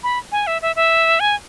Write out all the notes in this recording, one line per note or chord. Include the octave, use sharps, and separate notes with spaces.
B5
G#5
E5
E5
E5
G#5